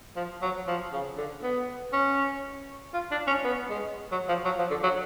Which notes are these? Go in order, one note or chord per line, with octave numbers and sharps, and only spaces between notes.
F3
F#3
F3
C#3
D3
B3
C#4
F4
D4
C#4
B3
G#3
F#3
F3
F#3
F3
D3
F#3